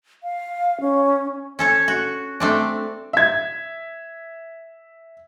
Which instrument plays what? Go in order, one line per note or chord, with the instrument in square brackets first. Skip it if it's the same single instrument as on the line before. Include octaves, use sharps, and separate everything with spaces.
[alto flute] F5
C#4
[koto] C#4 A4 C#5
F#4
A3 C4 D4
[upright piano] E5 G#6